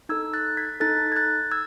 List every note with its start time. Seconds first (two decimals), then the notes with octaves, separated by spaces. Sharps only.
0.09 D#4 A4 E6 G#6
0.33 F#6 A6
0.57 G#6 B6
0.80 D#4 A4 F#6 A6
1.12 G#6
1.16 F#6 A6
1.51 E6 G#6